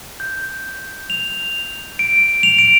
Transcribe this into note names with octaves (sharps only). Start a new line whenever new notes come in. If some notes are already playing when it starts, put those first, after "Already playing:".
G6
F7
D7
F7
D7